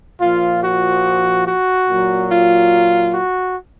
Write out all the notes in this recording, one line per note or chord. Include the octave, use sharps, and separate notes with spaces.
A#2 F3 F4
F#4
F#4
A#2 F#3
F4
F#4